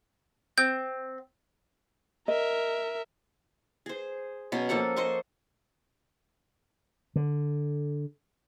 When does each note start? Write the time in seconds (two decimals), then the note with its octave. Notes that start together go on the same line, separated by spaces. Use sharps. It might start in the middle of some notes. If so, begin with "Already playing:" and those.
0.58 C4 G6
2.28 A#4 D#5 E5
3.86 G#4 C5
4.52 B2 F#3 B3 C#4
4.69 F3 A#3 A4 F#5
4.96 C5 D#5 C6 C#6
7.16 D3